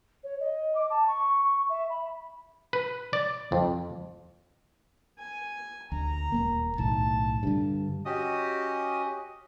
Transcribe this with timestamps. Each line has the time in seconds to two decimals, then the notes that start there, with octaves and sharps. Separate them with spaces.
0.24 C#5
0.40 D#5
0.75 D6
0.90 A5
1.08 C#6
1.44 C#6
1.69 E5
1.90 B5
2.73 B4
3.13 D5
3.52 F2
5.18 G#5
5.92 D2 A#5
6.32 D#1 D#2 A#3
6.78 B1 A2 D#3 A5
7.43 G2 D3
8.05 C#4 F#4 G4 D#5 D#6